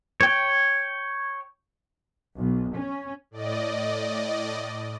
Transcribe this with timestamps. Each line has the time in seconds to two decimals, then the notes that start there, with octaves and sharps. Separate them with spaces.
0.21 C#5 G5
2.36 B1
2.75 C#4
3.31 A2 D5 D#5